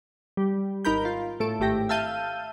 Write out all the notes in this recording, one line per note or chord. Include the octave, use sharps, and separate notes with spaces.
G3
G#1 D#4 A#4 B5 G6
F4
A2 A3 A4 D7
G#1 A2 A3 G4 G5 A#6
E5 F5 A5 G6 D#7